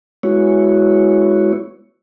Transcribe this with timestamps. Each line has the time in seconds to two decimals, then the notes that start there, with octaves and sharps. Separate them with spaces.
0.23 G#3 B3 E4 F#4 C#5